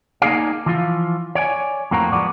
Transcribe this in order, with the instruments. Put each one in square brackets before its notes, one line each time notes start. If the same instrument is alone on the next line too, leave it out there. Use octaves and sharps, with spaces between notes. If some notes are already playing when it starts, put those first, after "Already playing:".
[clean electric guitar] A#3 B3 D#4 G#4 D5 F5
E3 F3 F4
C#5 D5 F#5 G#5
F2 A2 A#3 C4 F#4 A#5
F3 G#3 B3 D5